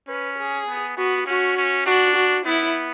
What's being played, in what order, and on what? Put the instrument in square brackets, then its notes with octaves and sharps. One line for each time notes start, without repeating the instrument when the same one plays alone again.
[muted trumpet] C#4 [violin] B4
[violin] G#4
[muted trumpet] B3
[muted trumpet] B3 [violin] F#4
[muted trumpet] C#4 [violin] F#4
[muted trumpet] C#4
[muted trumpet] D4 [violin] F#4
[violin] F#4
[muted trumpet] B3 [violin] E4